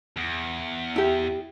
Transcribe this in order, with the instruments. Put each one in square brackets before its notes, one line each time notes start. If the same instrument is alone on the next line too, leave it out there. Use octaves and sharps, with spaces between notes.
[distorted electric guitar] E2
[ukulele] E4 G4